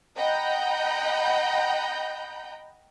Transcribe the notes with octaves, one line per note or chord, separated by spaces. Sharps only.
D#5 F#5 G5 A#5 B5 G6